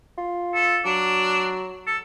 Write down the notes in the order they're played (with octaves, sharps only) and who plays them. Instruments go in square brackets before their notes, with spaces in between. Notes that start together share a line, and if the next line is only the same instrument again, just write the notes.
[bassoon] F4
[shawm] A4
[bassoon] F#3 [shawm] D4
[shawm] A4